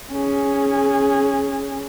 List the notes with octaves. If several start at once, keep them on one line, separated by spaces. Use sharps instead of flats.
C#4 G#4